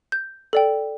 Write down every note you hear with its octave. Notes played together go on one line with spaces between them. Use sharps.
G6
A4 D5 G5